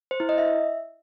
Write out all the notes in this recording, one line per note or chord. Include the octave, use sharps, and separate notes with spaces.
C5
E4
D#5
E5